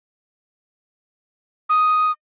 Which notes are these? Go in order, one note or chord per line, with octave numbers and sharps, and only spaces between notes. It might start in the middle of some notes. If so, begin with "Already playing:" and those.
D#6